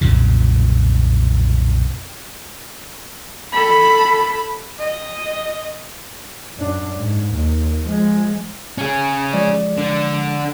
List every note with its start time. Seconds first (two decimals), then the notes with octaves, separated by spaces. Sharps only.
0.01 B1 F2 A#2 C#3
3.52 A4 B5
4.79 D#5
6.58 F#2 D4
6.98 G#2
7.34 D#2
7.87 F3 G#3
8.78 C#4 G#4
9.33 F3 G#3 D5
9.77 D3